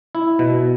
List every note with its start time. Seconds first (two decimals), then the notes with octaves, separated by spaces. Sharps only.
0.15 E4
0.39 B2